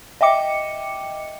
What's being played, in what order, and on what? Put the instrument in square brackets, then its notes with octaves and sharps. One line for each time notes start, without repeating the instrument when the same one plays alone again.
[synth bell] D#5 E5 G5 D6 C#7